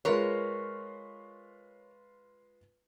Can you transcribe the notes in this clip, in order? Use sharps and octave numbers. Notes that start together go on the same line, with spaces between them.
G#3 F4 A#4 B4 C#5